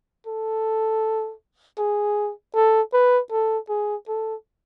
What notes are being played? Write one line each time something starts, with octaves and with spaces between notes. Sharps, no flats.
A4
G#4
A4
B4
A4
G#4
A4